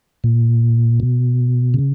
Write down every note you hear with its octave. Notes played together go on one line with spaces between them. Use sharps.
A#2
B2
C#3